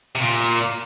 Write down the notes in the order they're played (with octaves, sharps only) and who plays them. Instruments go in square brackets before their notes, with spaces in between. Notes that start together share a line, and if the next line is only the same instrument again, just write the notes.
[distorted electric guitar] C3
A#2